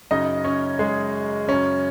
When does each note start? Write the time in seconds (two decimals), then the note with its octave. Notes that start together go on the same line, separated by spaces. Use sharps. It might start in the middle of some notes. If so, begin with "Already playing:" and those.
0.11 F#2 C#3 D#4 D#5
0.44 C#4 C#5
0.79 G#3 G#4
1.48 F#2 C#3 C#4